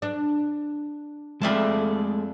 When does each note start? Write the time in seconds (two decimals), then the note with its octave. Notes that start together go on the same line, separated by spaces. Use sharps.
0.02 D4
1.41 F2 G#3 A3 D5 E5 A5